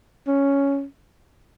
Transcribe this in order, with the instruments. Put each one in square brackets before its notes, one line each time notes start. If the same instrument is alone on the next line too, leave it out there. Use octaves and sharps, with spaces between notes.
[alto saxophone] C#4